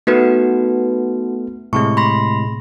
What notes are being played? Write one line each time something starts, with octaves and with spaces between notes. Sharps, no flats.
A3 B3 D#4 F#4 B4
A2 C3 G#3 C#6
B5 C6 A#6